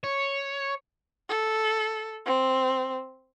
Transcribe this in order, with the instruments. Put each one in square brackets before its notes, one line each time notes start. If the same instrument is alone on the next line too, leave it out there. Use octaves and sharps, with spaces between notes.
[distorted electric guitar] C#5
[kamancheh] A4
C4